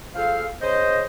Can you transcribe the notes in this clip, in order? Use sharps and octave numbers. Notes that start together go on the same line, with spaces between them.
F4 G#4 A4 C5 F5
C#3 C5 D#5